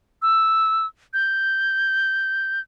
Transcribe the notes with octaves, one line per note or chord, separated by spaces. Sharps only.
E6
G6